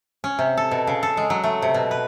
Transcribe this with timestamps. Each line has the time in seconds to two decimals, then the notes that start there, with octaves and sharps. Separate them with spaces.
0.24 C#4
0.39 C3
0.57 A4
0.71 B2
0.87 C#3
1.03 A4
1.17 G#3
1.30 F#3
1.44 A3
1.62 C3
1.74 B2
1.91 B4